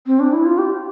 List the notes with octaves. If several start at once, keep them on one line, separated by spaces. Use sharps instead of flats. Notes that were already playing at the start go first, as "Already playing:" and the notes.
C4
D4
E4
F4
G4